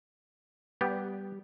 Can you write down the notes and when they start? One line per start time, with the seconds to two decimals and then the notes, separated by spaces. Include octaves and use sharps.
0.81 G3 B3 G4